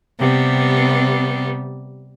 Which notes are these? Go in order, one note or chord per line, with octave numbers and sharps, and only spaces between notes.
C3 G3 B3